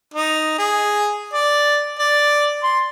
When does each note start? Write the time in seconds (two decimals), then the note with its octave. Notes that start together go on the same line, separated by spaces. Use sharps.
0.14 D#4
0.58 G#4
1.33 D5
1.99 D5
2.63 C6